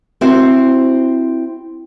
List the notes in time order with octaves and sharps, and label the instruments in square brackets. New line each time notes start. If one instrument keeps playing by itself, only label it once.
[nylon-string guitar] C4 E4 F#4 C5